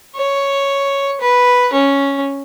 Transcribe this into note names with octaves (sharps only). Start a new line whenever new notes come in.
C#5
B4
C#4